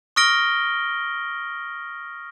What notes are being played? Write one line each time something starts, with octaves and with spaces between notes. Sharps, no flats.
C#6 D#6 F6 A#6 D7 G7